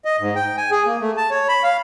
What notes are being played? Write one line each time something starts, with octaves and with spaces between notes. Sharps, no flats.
D#5
G#2
G5
G#5
G#4
A#3
A3
A5
C#5
B5
F5